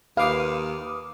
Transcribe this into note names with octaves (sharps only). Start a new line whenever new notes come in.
D#2 B4 F5 D6 D#6